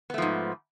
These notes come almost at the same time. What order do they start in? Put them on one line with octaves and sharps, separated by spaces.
B3 A3 F3 G#2